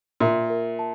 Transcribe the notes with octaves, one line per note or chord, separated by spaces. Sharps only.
A#2 E5
A#4
A5